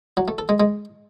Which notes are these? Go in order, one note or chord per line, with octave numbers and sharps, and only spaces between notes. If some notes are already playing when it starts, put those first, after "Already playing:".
F#3
A3
A4
G#3
G#3